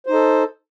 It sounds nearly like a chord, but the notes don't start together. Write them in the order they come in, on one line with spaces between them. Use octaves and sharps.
C5 D#4 A4